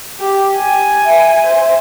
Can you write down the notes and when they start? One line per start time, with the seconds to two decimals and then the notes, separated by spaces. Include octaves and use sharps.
0.19 G4 G5
0.56 G#5
1.05 E5
1.47 C5